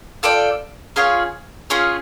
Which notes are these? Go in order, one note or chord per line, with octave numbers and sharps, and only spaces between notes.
F4 A4 D5 G5
C#4 F4 G#4 C#5
C#4 F4 G#4 C#5